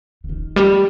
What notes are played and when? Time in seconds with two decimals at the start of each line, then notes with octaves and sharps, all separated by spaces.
0.24 C#3
0.29 D#3
0.56 G3